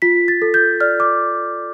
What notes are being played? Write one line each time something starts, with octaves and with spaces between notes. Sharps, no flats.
F4 B6
A6
A4
G6
D5 F6
D6